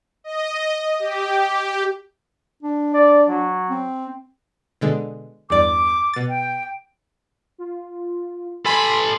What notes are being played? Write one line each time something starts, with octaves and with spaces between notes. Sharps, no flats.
D#5
G4
D4
D5
F#3
C4
B2 D3 G#3
E2 G2 D5 D6
B2 A6
G5
F4
A4 G#5 B5 C6